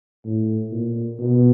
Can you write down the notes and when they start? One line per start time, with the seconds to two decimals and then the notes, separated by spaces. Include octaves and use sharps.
0.25 A2
0.72 A#2
1.20 B2